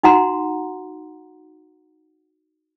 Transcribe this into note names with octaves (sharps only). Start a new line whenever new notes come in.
D#4 F#4 F#5 A#5 C6